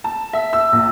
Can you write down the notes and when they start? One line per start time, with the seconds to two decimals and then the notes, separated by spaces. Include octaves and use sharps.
0.04 A5
0.33 E5
0.53 E6
0.73 A#1